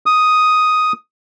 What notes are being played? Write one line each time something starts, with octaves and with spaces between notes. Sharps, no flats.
D#6